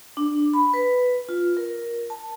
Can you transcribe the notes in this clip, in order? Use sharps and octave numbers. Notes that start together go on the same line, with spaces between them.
D4
B5
B4
F4
A#4
A5